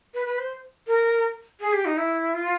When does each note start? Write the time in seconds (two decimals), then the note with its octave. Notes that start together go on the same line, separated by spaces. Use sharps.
0.14 B4
0.26 B4
0.38 C5
0.87 A#4
1.61 G#4
1.73 G4
1.85 D#4
1.97 E4
2.34 F4